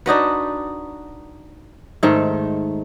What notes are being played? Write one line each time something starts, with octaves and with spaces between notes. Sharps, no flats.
D4 D#4 F#4 B4
G#2 D#3 A3